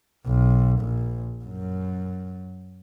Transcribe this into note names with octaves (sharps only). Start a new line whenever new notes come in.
B1
A#1
F#2